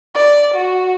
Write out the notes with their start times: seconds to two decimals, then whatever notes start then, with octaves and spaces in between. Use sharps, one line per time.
0.15 D5
0.54 F#4